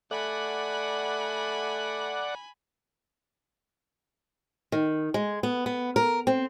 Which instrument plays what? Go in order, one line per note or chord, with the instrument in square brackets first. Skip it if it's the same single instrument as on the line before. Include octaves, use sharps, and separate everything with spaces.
[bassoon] A3 [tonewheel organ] D5 F#5 [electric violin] G#5 B5
[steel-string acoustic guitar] D#3
G#3
B3
B3
A#4
C4